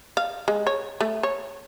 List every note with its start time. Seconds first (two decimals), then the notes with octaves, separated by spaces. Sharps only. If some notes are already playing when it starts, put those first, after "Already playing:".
0.17 F5
0.48 G#3
0.67 C#5
1.01 A3
1.23 C#5